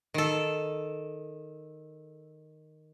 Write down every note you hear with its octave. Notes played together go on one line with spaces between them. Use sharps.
D#3 A4